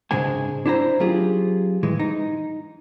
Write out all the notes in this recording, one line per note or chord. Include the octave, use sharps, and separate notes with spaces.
C2 G#2 C#3 G#3 D4 G#5
D4 E4 C5 A#5
F#3 C#4 F4 G4 G#4
A2 E3 G#3
D#4